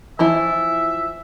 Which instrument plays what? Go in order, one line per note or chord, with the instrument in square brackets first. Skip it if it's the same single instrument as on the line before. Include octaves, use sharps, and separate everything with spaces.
[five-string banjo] E3 F3 E4 [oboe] E5